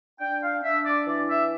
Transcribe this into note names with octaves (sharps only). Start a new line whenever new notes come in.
D4 G5
F5
D4 E5
D5
E3 D5
E5